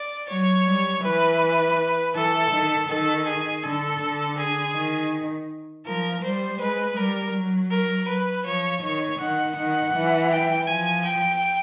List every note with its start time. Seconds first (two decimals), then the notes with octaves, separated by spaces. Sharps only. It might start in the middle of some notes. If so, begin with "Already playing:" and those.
Already playing: D5
0.29 F#3 C#5
0.67 G3
1.03 E3 B4
2.14 E3 A4
2.51 D#3
2.89 D#3 A4
3.27 G#4
3.63 D3 A4
4.01 D3
4.38 G#4
4.74 D#3
5.86 F3 A#4
6.23 G3 C5
6.60 G#3 B4
6.96 G3 A#4
7.33 F#3
7.71 A#4
8.08 B4
8.45 F3 C#5
8.83 D#3 C#5
9.19 D#3 F#5
9.56 D#3 F#5
9.94 E3
10.31 G5
10.67 F3 G#5
11.05 G5